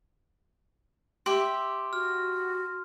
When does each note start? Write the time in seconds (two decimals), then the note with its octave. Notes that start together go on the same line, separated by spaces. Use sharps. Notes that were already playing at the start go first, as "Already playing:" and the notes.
1.26 G4 E5 C6
1.93 F#4 F6